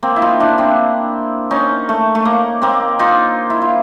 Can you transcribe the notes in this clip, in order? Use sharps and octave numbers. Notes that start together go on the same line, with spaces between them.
A#3 C4
E4
D#4 F4
D4 E4
C4 D4
C#4 D#4
A3
A3
A#3
A#3 C4
D#4 F4
E4
F4